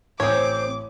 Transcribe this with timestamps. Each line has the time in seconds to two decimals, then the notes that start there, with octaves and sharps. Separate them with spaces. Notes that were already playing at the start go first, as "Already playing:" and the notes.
0.20 A1 C4 C#4 A#4 C#5 D6 D#6